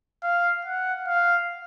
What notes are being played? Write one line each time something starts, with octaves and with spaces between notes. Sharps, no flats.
F5
F#5
F5